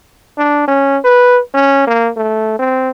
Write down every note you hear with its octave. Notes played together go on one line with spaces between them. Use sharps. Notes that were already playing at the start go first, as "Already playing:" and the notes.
D4
C#4
B4
C#4
A#3
A3
C4